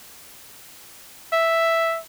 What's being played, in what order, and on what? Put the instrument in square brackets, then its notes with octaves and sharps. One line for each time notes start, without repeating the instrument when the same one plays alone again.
[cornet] E5